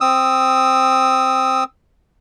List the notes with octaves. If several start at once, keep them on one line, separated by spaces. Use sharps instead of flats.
C4 D#6 E6